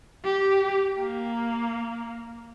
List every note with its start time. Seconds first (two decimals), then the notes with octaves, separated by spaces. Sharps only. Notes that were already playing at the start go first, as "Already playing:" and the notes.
0.24 G4
0.99 A#3